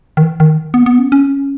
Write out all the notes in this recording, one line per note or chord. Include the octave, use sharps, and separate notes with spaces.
D#3
E3
D#3
B3
A#3
B3
C#4
C#4